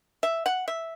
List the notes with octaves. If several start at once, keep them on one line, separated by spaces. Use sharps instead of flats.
E5
F#5
E5